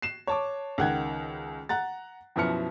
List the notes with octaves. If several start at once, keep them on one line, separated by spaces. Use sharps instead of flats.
C7 E7
C#5 A5 D6
C#2 D#3 F#5 G5 G#6
F#5 A#5 A6
F#2 B2 F3 E4 F6 C#7